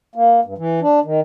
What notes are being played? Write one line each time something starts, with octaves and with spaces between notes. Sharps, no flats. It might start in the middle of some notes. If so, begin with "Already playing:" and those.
A#3
G2
E3
D4
D#3